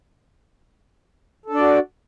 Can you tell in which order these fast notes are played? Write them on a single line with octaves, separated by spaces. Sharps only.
A4 D4 D5 F#4